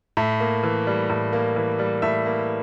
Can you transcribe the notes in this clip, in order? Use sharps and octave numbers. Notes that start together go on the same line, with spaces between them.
A2 E5
A#3
E3
G3
A2
A#3
E3
G3
A2 E5
A#3